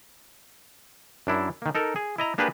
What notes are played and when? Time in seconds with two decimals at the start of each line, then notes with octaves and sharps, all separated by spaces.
1.27 F#2 D4 E4
1.62 D#3 A#3
1.75 D#4 A4 A#4
1.96 G#4
2.18 E4 D#5 A#5
2.38 A#3 D4 G4 G#4 B4